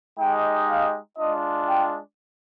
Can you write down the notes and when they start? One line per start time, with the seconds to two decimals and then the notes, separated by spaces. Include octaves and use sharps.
0.19 G#3 D#4 G4 G5
0.69 F5
1.19 G#3 D4 F4 D#5
1.69 G5